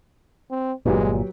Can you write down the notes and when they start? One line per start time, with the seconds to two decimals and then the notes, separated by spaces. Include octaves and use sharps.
0.51 C4
0.86 G1 A#2 F#3 G#3 G4 B4